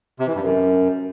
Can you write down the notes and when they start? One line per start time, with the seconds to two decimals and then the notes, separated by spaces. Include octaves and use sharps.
0.20 C3
0.27 E3
0.35 G2
0.42 F#2